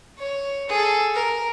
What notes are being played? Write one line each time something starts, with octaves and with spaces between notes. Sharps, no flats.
C#5
G#4 A4
A#4